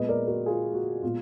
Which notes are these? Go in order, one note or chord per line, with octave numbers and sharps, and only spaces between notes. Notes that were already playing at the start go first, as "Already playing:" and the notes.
Already playing: A#2 G#3 B3 B4 D#5
A#4 D5
F#4 A#4
F4 G#4
F#4
A#2 G#3 B3 F4